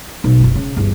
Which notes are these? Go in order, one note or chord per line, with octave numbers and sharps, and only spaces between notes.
B1
F#1 F4
C#3
G1 E2